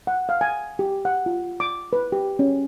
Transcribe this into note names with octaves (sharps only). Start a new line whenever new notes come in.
F#5
F5
G#5
G4
F#5
F4
D6
B4
G4
C#4